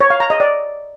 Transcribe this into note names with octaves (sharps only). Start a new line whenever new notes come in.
C#5
F5
A#5
D#5
D5